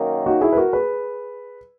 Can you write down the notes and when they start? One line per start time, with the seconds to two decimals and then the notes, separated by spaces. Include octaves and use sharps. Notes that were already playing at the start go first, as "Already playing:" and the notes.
Already playing: F#2 D#3 A#3
0.26 D#4 F#4
0.41 E4 G#4
0.53 B4
0.57 F#4 A#4
0.73 G#4 B4